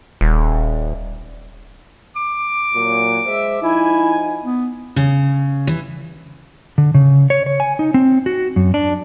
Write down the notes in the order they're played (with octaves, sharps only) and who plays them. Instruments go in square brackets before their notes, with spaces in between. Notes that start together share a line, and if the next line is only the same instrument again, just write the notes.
[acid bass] D#1
[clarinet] D6
[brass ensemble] A#2 F#3
G#3 C5 E5
[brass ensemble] F3 D#4 G#5 [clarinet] E4
[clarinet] B3
[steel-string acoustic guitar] C#3
E3
[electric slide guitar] D3
C#3
C#5
C#5
G#5
D#4
C4
F#4
F#2
D4